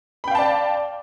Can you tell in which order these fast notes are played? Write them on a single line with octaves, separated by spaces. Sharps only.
B5 G5 F5 A5 D5